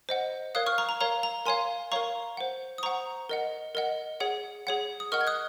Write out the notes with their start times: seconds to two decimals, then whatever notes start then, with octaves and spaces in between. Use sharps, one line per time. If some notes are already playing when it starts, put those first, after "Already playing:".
0.09 C5 D#5 F#5
0.55 A#4 C#5 F5 D#6 F#6
0.66 C#6 F6
0.78 A#5 C#6
0.89 A#5
1.01 A#4 C#5 F5 A#5
1.23 A#5
1.46 A#4 C#5 F5 G#5 C6
1.92 A#4 C#5 F5 A#5 C#6
2.37 C5 F#5
2.78 D#6
2.83 C5 F#5 A#5 C#6
3.29 A#4 D#5 F#5
3.75 A#4 D#5 F#5
4.20 G#4 C#5 F#5
4.67 G#4 C#5 F#5
5.00 D#6
5.12 A#4 D#5 F#5 C#6 F6
5.21 G#6
5.27 D#6 F#6